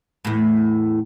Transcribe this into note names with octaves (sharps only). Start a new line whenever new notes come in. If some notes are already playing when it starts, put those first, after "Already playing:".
E2 A2